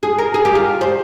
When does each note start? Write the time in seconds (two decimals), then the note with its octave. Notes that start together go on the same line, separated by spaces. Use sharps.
0.03 G#4
0.19 A#4
0.34 G#4
0.45 G4
0.55 F4
0.81 C5